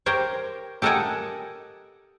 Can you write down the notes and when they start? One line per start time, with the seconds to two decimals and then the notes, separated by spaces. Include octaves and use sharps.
0.06 G4 A#4 C5 C#5
0.82 G4 A4 A#4 D#5 F#5 G#5